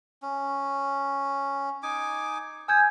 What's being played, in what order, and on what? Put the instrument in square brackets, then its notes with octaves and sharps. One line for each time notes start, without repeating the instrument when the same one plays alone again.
[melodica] C#4
D#4 G#5 D6
[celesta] G#5 G6 G#6 [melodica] D#6 E6